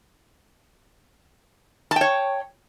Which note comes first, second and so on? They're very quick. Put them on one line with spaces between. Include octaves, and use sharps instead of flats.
A5 G5 C#5